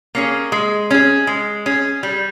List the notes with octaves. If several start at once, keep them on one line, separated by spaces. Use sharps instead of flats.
A#3 C#4 G#4
G#3
C#4 G#4
G#3
C#4 G#4
G3